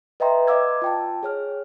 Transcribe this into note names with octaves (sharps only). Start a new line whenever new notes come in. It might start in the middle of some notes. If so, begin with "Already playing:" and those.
B4 D#5 E5 G5 A#5 C6
D5 D#5 F5 D6 E6 G#6
F4 G5 A5
G#4 C#5 F6